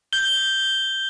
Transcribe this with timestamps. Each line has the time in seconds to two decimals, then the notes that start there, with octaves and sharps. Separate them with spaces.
0.13 G6 G7